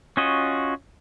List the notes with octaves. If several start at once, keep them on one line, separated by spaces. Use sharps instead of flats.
C#4 F4 F#4 D#5